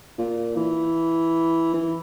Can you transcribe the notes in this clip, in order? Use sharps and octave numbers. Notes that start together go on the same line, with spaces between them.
A#2
E3
E3